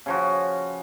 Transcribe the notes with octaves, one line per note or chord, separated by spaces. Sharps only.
C#3 F3 F#4